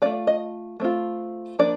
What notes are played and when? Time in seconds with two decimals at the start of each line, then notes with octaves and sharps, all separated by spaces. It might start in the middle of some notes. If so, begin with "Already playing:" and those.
0.02 C4 F4 D5
0.05 A3
0.27 D#5
0.80 A3 C4 F4
1.59 F3 A#3 D4 D5